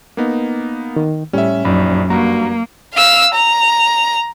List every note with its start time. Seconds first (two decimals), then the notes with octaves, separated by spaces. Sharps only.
0.17 A#3 B3 D#4
0.96 D#3
1.33 A2 G3 C#4 E5
1.65 A#1 F#2 D#4 D5 B5
2.10 G2 A#3 F#4 A#5
2.95 F5 E6
3.35 A#5